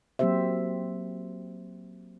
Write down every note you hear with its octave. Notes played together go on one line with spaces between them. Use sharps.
F#3 A#3 C4 G4 C5 E5